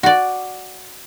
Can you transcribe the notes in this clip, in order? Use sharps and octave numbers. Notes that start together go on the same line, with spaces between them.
F#4 D5